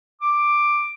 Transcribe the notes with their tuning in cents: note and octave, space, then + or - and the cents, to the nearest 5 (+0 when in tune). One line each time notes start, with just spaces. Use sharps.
D6 +5